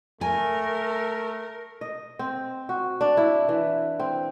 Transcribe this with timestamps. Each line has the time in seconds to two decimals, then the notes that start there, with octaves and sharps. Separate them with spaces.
0.21 A3 A#4 G#5
1.81 D#5
2.19 C4
2.69 F#4
3.01 D4
3.17 E4
3.49 E3
4.00 C4